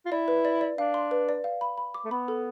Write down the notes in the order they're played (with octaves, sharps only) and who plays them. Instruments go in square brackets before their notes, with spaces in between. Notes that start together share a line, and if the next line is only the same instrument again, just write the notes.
[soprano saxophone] F4
[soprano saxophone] E4 [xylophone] D5
[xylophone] B4
D5
D5
[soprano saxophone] D4 [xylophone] F5
[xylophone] C6
B4
D5
F5
B5
B5
D6
[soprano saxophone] A3
[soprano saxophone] B3 [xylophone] B5
[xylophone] A4